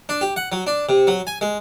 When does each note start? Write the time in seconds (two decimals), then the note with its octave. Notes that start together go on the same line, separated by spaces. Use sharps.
0.09 D4
0.21 G4
0.36 F#5
0.52 F#3
0.67 D4
0.89 C3
1.07 F#3
1.27 G#5
1.41 G#3